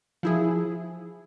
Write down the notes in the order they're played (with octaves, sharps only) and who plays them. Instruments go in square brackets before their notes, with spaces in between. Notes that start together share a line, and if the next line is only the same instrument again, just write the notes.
[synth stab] F3 E4 G#4